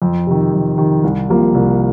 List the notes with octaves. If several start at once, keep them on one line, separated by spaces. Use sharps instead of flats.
F2
C3 D#3
F2
C3 D#3
C2
C3 F3 A#3
C2